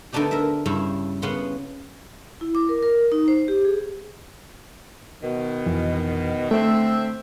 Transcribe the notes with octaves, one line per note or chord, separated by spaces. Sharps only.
D3 A3 B3 D4 D#4 G4
A#4 E5
G2 C#3 E4
C#3 B3 F#5 C6
E4
D6
A#4
A#4
D#4
C5
G4
G#4
B2 D#3
F2 E3
D3 A3 C4 E5